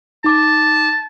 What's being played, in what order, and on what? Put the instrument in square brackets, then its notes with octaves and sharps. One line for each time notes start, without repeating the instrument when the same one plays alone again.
[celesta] D#4 D6 [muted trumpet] A5